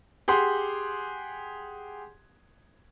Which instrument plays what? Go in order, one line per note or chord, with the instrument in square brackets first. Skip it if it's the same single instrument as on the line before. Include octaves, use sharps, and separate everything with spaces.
[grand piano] G4 G#4 F#5 C6